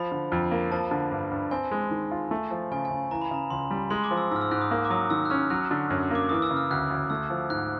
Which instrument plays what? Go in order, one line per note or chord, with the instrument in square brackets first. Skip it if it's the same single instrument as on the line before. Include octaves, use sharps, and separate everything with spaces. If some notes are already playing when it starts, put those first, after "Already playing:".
Already playing: [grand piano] F3 [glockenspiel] B5
[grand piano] D3
F2
A#3
[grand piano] F3 [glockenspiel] A5
[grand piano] D3
G2
G2
[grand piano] C4 [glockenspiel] G#5
[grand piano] G#3
D#3
F4
A3
F3
[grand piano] C#3 [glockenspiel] G#5
[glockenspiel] G#5
[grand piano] C#3
[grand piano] E3 [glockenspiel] A#5
[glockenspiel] B5
[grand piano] C#3 [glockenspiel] A#5
[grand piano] C#2 [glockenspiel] C6
[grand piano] G3
[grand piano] G#3 [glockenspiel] C6
[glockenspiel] D6
[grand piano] F3
[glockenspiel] E6
[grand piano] G#2 [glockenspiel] E6
[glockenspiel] F6
E6
[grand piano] G#2 [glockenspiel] F#6
[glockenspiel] D#6
[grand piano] A#3
[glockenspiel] D6
[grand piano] F#3 [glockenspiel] D#6
[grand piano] D#3 [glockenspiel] E6
[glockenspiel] F#6
[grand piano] C#4 [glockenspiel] F6
[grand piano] F#3 [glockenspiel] F#6
[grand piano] D3
F#2
[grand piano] A#3 [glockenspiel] D6
[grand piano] E3 [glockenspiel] D#6
[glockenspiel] E6
[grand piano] C#3
[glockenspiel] F6
[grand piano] D2 [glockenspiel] F#6
[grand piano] D2
[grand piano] A3 [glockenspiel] E6
[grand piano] F3
[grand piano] G#2 [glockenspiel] F#6